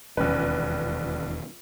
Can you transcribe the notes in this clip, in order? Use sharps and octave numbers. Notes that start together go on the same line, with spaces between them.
E1 A#1 D#2 C#4 B4